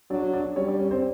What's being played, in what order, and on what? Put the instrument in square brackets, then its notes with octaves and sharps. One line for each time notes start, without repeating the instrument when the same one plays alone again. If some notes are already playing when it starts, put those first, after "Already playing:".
[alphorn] F#3 [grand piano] D4 D5
[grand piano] D4 D5
[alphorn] G3 [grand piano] C#4 C#5
[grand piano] D4 D5
C#4 C#5
C4 C5